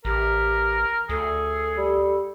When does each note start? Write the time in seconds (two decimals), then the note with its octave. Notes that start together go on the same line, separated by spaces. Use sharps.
0.05 A1 G4 A#4
1.09 D2 G#4 A4
1.77 G3